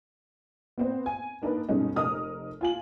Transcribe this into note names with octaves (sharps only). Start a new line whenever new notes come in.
B3 C4 C5
G#5
A#3 D4 D#4 A#4 B4
G2 B2 G#3 A3 C#4 D#4
F1 A#4 D#5 D#6 F6
F4 G#5 F#7